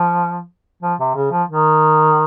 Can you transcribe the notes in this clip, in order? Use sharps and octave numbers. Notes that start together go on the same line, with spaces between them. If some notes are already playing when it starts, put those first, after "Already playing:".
Already playing: F3
F3
C3
C#3
F3
D#3